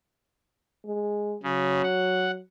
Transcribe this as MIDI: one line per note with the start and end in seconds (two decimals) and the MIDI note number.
0.86 1.36 56
1.43 1.82 49
1.43 2.41 54
1.83 2.31 78